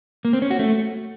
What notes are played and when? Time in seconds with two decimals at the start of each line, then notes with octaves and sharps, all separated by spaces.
0.25 A#3
0.33 C4
0.42 C#4
0.51 F#4
0.59 A3